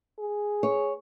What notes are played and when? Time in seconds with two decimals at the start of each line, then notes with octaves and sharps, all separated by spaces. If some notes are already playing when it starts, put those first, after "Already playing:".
0.19 G#4
0.63 C#5